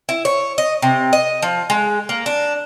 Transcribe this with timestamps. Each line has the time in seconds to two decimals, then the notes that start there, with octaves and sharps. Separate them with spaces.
0.09 E4
0.25 C#5
0.58 D#5
0.82 C3
1.13 D#5
1.42 F3
1.70 G#3
2.09 A#3
2.26 D4